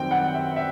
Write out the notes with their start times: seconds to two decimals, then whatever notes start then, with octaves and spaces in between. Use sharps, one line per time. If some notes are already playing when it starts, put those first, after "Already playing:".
Already playing: F#2 D#3 G3 C4 G5
0.11 F#5
0.34 E5
0.56 E5